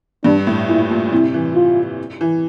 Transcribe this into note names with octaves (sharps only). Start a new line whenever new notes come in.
G2 D4
A2
A#2 E4
A#2
C3 E4
E3
F4
E3